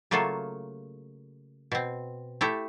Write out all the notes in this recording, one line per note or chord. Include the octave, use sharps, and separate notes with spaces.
C#3 F#3 A3 A#3 F4 A4
B2 C4
A3 E4 G4 A4